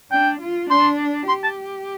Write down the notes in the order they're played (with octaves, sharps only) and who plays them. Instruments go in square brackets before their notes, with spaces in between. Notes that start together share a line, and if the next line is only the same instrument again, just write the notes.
[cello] D4 [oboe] G5
[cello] F4
[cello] D4 [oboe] C6
[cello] G4 [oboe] C6
[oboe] A5